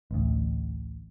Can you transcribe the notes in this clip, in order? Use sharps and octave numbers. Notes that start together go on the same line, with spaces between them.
A1 D2